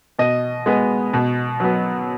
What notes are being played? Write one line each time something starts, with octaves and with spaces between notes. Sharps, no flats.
B2 D#5
G#3 B3
B2
F#3 B3